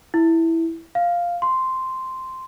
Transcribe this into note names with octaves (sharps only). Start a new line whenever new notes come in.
E4
F5
C6